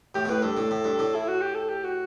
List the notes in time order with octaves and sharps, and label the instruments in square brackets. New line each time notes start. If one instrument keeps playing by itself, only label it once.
[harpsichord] A2 [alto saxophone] G4
[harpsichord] B2
[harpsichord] A2 [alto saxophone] B4
[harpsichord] G2 [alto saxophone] A4
[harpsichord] A2
A2
G2
A2
[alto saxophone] E4
F#4
G4
A4
G4
F#4